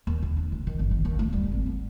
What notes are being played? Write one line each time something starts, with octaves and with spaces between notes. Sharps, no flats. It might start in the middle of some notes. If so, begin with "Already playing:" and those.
D#2
D3
D4
D2
D#3
G1
D#3
D#2
A3
G3
G#1
B3